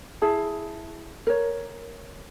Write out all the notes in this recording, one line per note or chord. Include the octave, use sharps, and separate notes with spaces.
E4 G#4 A5
A#4 C#5